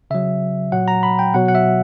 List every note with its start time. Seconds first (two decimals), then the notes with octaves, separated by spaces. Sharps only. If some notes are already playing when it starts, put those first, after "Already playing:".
0.11 C#3 F#3 E5
0.72 A#2 F#3 F#5
0.88 A#5
1.03 B5
1.19 G5
1.34 B2 F#3 F#5
1.48 F#5
1.55 E5